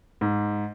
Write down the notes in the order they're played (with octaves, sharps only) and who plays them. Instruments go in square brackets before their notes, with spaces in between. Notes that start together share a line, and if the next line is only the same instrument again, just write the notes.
[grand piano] G#2